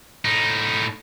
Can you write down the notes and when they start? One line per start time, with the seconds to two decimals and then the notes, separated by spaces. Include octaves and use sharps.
0.25 A2 D#4